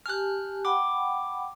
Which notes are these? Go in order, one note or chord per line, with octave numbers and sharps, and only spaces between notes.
G4 G#5 A5 F6 F#6
F#5 G5 B5 D6